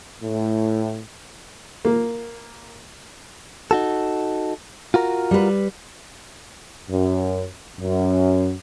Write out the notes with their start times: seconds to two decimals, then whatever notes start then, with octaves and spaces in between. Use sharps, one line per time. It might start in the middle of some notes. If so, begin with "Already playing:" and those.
0.22 A2
1.85 A#3
3.71 D#4 F#4 A4
4.94 F4 F#4 A#4
5.31 G3 B4
6.89 F#2
7.80 F#2